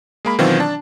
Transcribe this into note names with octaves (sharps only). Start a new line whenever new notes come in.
G#3 A#3 B5
B2 D#3 E3 F#3 C4 F4
D4 A5